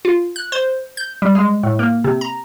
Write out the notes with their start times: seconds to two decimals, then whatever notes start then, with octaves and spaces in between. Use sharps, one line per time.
0.05 F4
0.36 F#6
0.52 C5
0.97 G6
1.22 G3
1.35 G#3
1.63 A2
1.79 A#3
2.04 C3
2.21 A#5